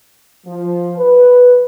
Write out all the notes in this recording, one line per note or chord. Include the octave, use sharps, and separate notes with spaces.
F3
B4